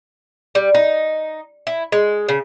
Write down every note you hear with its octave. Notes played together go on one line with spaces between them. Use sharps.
G3
D#4
E4
G#3
C#3